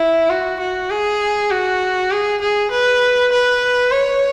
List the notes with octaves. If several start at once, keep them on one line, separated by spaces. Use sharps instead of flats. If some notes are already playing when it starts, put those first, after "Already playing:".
Already playing: E4
F#4
F#4
G#4
F#4
G#4
G#4
B4
B4
C#5